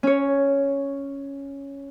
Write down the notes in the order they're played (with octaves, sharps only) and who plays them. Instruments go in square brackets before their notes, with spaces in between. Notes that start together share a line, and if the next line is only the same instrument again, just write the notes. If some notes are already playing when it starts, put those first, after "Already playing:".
[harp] C#4 C#5